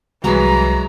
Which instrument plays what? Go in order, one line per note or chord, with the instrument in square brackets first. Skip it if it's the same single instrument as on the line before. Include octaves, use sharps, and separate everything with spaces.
[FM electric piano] C2 [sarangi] E3 [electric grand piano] F#3 G#3 F#4 [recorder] A#5